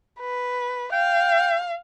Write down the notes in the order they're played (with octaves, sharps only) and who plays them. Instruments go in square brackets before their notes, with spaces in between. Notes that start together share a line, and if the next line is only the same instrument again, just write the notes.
[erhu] B4
[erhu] F5 [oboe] G5